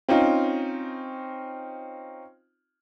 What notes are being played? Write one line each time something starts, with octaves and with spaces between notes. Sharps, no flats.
C4 C#4 D#4 F4